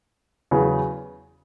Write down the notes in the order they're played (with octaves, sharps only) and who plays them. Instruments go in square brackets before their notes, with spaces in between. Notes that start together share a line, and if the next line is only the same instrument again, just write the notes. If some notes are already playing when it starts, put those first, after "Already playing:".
[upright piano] E2 C#3 F#3 B3 G#4